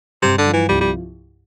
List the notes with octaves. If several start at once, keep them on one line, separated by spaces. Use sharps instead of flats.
G2 C3
D3
F3
E3
C2 G3
G3